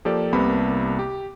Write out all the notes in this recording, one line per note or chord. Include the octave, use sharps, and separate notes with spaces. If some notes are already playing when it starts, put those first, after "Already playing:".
F3 A#3 G4 A4 D5
C2 C3 A#3 B3 A5 B5
G4